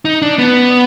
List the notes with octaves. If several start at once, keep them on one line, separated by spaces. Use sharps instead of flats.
D#4
D4
B3